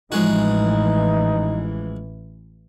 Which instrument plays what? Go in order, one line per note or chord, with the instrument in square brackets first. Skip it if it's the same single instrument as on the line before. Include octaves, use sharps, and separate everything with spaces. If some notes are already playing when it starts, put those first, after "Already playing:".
[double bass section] A1 E3 [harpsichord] F3 G#3 F#4 [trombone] D#4